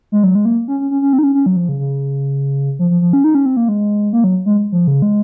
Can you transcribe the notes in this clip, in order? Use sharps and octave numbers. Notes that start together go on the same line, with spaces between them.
G#3
F#3
G#3
A#3
C#4
C#4
C#4
C#4
C4
D#4
C#4
C#4
F#3
F3
C#3
C#3
F3
F3
F3
C#4
D#4
C#4
C4
A#3
G#3
A#3
F#3
G#3
F3
C#3
G#3